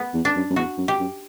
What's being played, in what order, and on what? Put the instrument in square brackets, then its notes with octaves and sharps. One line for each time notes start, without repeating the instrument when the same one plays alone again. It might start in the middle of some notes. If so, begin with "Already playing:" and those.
Already playing: [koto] B3
[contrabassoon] E2
[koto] D4
[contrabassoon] F#2
F#2
[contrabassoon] E2 [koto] F#4
[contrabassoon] F#2
[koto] G4
[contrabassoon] F#2